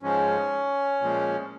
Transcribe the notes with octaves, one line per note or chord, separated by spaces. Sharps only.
G#2 F3 G#3 C#4
A#2 F3 G#3